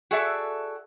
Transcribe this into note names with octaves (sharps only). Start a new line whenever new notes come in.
F#4 G#4 A4 D5 E5